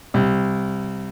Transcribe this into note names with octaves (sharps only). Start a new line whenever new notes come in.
C2